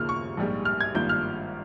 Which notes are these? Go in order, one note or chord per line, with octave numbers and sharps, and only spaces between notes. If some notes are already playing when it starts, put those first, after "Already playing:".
Already playing: D#2 C#3 F3 A#3 F6
C#6
A#1 G#2 G3 A#3
F6
G#6
G#1 G2 F3 A#3 G6
F6